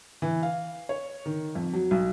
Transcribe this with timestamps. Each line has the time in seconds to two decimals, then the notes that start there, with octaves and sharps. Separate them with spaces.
0.22 E3
0.43 F5
0.89 C#5
1.26 D#3
1.55 F2
1.73 F#3
1.91 B1